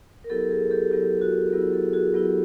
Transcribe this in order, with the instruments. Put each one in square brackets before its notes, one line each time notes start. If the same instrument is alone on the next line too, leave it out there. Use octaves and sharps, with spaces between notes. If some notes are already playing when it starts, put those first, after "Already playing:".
[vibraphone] A#4
F#3 B3 E4 G4 A4
G#4 A#4
G4 A4
F#3 B3 E4 G4
F#4
G4
F#3 B3 E4 G4
G4 A4
F#4 G#4
F#3 B3 E4 G4